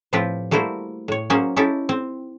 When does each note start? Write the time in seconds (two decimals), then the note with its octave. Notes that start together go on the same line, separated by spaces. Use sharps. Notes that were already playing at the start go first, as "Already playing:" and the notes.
0.13 A2 F3 C4 F4 G4 B4
0.51 G3 A3 A#3 E4 F#4 C5
1.08 A2 C#5
1.30 F#3 A#3 C#4 G#4 C5 G#5
1.56 C#4 D#4 E4 G4 A4
1.89 C4